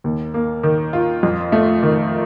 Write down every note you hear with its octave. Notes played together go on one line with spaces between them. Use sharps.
D#2
A#3
D#3
F4
F2
A3
D#3